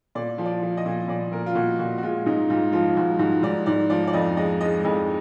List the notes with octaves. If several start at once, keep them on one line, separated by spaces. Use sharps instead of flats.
A#2 D5
F3
D5
F3
D#5
A#2
A#2 D5
A#2 A#4
F4
A#2 F#4
A#2 F#4
F#4
G#3 F4
G#2 D#4
G#2 F4
F3 F4
G#2 F#4
G#2 F#4
G#2 D5
G#2 D5
F3 D5
D5
F2 D#5
G#3 D#5
G#3 D#5
F2 D#5